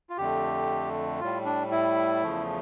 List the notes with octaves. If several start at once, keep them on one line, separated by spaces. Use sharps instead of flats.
F4
F2 D3 A3 G4
A2 G3 F4
D4
E4
E2 C#3 F3 A3